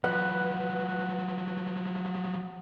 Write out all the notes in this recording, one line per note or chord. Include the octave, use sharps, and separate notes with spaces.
F3 F#3 B4 F#5